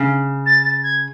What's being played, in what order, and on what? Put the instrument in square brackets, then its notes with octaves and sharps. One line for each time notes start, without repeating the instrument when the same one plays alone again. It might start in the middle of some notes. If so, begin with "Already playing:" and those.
Already playing: [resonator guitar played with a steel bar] C#3
[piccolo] A6
A6
G#6